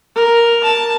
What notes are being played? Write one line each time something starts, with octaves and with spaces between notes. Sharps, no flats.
A#4
A5